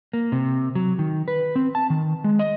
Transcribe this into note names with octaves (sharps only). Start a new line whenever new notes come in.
A#3
C3
F#3
D#3
B4
C4
A5
D#3
G#3
D#5